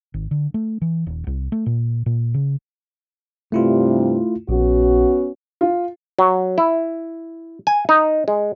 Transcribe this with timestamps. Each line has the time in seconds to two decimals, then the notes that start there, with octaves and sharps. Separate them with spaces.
0.14 G#1
0.31 D3
0.54 A3
0.82 E3
1.07 D#1
1.27 C2
1.52 A3
1.66 A#2
2.06 A#2
2.34 C#3
3.52 G2 C3 A3 E4 F4
4.49 A#1 B3 C#4 F#4
5.61 F4
6.19 F#3
6.58 E4
7.67 G#5
7.89 D#4
8.28 G#3